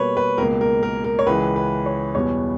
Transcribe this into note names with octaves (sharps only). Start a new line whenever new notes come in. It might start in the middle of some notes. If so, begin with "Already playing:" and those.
Already playing: B2 G3 A#3 B4 C#5
B4
C#2 B2 A#3 A#4
A#4
A#4
A#4
C#5
C#2 C#3 E3 B4
B4
C#5
E2 B2 G3 B3 C#5